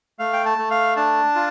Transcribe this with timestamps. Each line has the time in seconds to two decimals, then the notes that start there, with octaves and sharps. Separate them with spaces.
0.19 A3 F5
0.33 G5
0.46 A5
0.58 A3
0.71 F5
0.97 D4 A5
1.35 F4